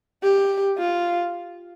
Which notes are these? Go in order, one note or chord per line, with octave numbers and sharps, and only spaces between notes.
G4
F4